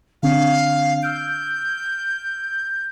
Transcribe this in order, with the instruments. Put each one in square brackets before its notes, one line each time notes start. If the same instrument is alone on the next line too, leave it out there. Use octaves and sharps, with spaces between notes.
[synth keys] D3 C4 D4 [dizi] F5
[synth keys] E6 F6 D7 [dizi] G6